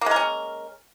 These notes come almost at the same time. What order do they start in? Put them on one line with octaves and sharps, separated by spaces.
A#3 G#3 A#4 C#4